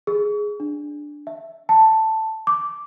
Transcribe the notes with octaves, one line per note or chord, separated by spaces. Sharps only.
G#4
D4
E5
A5
D6